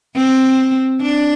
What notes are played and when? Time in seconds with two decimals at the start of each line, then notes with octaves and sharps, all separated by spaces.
0.16 C4
1.02 D4